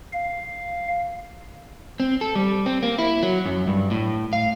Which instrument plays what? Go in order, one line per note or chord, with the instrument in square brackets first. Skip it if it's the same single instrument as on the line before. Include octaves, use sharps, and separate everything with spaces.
[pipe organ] F5
[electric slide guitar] C4
A4
G3
C4
A#3
E4
F#3
F#2
G2
A2
F5